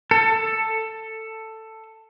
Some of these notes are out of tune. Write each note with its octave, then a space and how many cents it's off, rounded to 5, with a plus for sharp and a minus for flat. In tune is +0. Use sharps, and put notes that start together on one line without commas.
A4 +10